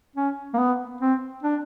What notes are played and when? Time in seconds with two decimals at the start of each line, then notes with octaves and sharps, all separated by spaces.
0.16 C#4
0.54 A#3
0.58 B3
1.01 C4
1.43 D4